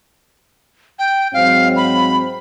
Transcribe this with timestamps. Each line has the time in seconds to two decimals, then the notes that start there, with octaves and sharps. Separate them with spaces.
0.99 G5
1.34 G#2 F#3 C4 F5
1.76 B5